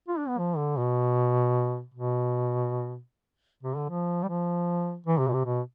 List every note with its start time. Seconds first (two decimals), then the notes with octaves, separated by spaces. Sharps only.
0.08 F4
0.18 D4
0.28 B3
0.38 F3
0.57 D3
0.78 B2
1.94 B2
3.63 C3
3.76 D3
3.89 F3
4.23 G3
4.28 F3
5.06 E3
5.19 C3
5.28 B2
5.33 C3
5.45 B2